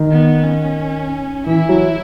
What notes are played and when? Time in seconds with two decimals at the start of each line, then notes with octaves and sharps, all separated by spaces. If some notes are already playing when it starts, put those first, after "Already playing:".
Already playing: D#3
0.11 B3
0.44 C#4
1.46 E3 E4
1.69 F#3